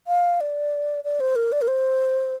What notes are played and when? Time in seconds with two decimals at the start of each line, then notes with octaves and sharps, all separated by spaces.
0.07 F5
0.41 D5
1.04 D5
1.20 C5
1.36 A#4
1.52 D5
1.62 A#4
1.68 C5